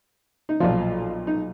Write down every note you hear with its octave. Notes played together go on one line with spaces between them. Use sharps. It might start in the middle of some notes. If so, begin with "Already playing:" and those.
D#4
B1 A#2 F3 F4
D#4